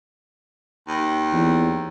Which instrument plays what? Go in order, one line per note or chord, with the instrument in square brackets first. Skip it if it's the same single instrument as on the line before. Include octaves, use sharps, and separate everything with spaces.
[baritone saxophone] D#2
[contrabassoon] E2